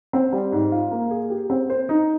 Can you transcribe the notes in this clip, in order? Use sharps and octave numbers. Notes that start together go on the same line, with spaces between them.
C4
G3
G#2
F4
A#3
G#4
G4
C4
C5
D#4